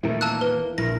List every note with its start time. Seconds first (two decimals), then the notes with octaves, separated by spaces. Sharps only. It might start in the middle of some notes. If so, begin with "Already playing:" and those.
0.03 E2 A#2 D#3 A3 E4 A#4
0.21 A#3 A5 E6 F#6
0.41 B4
0.78 A#1 E4 A#4 A#6